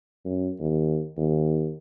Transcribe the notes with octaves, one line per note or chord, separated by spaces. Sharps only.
F#2
D#2
D#2